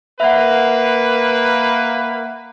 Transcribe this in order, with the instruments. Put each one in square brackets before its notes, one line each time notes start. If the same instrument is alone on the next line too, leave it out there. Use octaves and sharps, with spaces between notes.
[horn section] A#3 B4 [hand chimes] E5 F#5